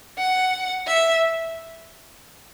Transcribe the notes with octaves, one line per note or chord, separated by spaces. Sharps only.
F#5
E5